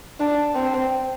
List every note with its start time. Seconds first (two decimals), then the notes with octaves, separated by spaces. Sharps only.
0.20 D4
0.55 C4